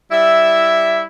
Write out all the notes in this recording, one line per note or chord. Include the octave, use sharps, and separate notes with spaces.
G3 E4 E5